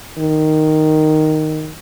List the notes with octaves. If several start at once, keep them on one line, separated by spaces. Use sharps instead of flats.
D#3